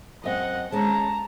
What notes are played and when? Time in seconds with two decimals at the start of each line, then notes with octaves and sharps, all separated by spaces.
0.24 F#2 C4 D#5 F#5
0.72 G#3 C#4 A5 A#5